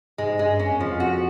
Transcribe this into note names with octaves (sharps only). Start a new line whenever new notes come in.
G#2 G#3
G2 G#3
F#2 C#4
E2
F2 F3
F#4